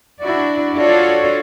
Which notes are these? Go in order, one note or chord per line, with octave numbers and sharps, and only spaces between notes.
D4 E4 F#4 D5
D4 F4 F#4 A4 C#5 D5